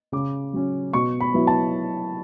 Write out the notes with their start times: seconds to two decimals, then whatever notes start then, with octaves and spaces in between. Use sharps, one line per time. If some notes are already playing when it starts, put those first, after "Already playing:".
0.12 C#3 D6
0.53 F#3 C#4
0.93 B2 C#6
1.21 B5
1.34 F#3 B3 E4
1.47 A5